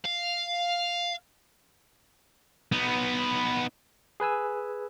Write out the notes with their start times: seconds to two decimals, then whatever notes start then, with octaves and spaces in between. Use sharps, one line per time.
0.05 F5
2.72 B3 D#4
4.20 G#4 B4 G#5 E6